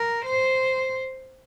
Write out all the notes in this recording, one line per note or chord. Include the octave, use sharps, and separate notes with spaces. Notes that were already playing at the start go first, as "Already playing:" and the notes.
Already playing: A#4
C5